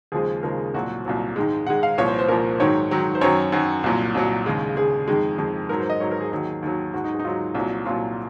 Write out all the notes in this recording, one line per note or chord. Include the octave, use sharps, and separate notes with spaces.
D#2 C#3 F3 G#3 G#4
D#2 C#3 F3 G#3 A#4
C2 A#2 F#3 F#4
C2 A#2 F#3
G#2 D#3 G#3
G#2 D#3 G#3 F#5
F5
C2 A#2 F3 C#5
C5
C5
C2 A#2 F3 A#4
G#2 D#3 F#3 C#5
G#2 D#3 F#3
C5
F#2 D#3 F#3 C#5
F#2 D#3 F#3 F#4
C2 A#2 F#3
C2 A#2 F#3
D#2 C#3 G#3
D#2 C#3 G#3 G#4
F2 D#3 G#3
F2 D#3 G#3
G#2 F#3 A#4
C5
D#5
G#2 F#3 C#5
A#4
G#4
D#2 D#3 F#3
D#2 D#3 F#3
G#2 F#3 F#4
D#4
G#4
D#4
G#2 F#3 F4
C2 A#2 F#3
C2 A#2 F#3 F4